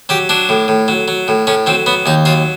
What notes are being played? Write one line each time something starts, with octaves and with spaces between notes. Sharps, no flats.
F#3 G4
F#3 D4
A2
A2
F#3
F#3
A2
A2 C#4
F#3 C4
F#3 B3
D#2 D#4
F#3 F4